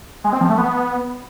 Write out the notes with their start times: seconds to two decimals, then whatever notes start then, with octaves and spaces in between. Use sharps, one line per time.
0.24 G#3
0.33 C4
0.41 F3
0.49 A3
0.58 B3